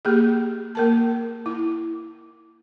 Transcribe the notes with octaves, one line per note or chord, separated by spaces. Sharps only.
A#3 G4 G#4
A#3 A#4 A5
E4